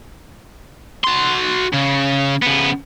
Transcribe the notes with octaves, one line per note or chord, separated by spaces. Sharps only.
F#4 C6
C#3
C#3 B3